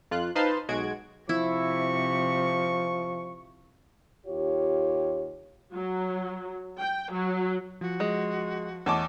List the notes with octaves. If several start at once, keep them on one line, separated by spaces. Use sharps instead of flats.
F2 F4 F#6
D#4 B4 C5 F5 A5 C6
B1 G#3 F#4 G#6 D7
C3 F3 E4 C#6
D#2 F4 G4 C#5
F#3
G5
F#3
F3 F#4
G#3
E2 A3 C#5 D#5 A5 D6